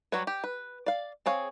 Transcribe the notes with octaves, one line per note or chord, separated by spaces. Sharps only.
F#3 G3 B4 C#5
G4
B4
D5 F5
C4 G#4 C#5 F5